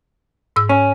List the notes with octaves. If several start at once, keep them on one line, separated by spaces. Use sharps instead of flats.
G#2 E6
C#4